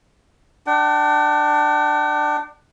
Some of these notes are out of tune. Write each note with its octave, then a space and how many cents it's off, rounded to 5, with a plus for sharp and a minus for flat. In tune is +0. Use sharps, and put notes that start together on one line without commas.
D4 +15 G5 -45